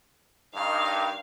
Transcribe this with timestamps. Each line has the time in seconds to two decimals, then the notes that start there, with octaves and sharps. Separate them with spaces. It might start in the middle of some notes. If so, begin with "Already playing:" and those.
0.55 G2 D#3 F5